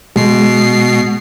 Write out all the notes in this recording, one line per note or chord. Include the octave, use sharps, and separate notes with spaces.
B2 G#3 C7